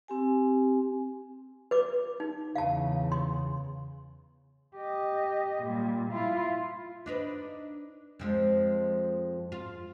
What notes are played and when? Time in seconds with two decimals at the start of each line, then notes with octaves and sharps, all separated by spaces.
0.08 C4 G4 G#5
1.71 B4 D6
2.20 D#4
2.56 E2 C#3 F5 A5
3.12 C6
4.76 G4 D#5
5.63 A#2 G3
6.12 E4 F4
7.06 D4 D#4 B4
8.19 F2 F3 G#3
9.52 F4